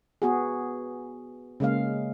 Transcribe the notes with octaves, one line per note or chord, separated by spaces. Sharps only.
B3 F#4 G#4
C#3 G#3 A#3 F5